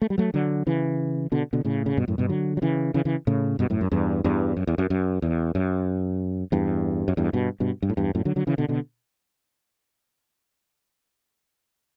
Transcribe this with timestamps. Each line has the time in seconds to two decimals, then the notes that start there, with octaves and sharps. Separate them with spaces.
0.02 A3
0.10 G3
0.18 F#3 A3
0.34 D3 F#3
0.67 C#3 E3
1.32 B2 D3
1.53 B2 D3
1.65 A2 C#3
1.86 C#3
1.97 G2 B2
2.08 F#2 A2
2.18 G2 B2
2.29 D3 F#3
2.57 F#3
2.62 C#3 E3
2.94 C#3 E3
3.05 C#3 E3
3.27 A2 C#3
3.59 G2 B2
3.70 F#2 A2
3.81 F#2
3.91 E2 G2
4.24 E2 G2
4.57 F#2
4.67 E2
4.78 F#2
4.90 F#2
5.22 E2
5.55 F#2
6.52 E2 G2
7.08 F#2
7.17 E2 G2
7.33 G2 B2
7.60 G2 B2
7.82 G2
7.90 A2
7.97 E2 G2
8.15 F#2 A2
8.25 D3 F#3
8.36 D3 F#3
8.47 C#3 E3
8.58 B2 D3
8.69 B2 D3